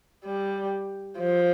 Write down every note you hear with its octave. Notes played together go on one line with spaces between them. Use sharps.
G3
F3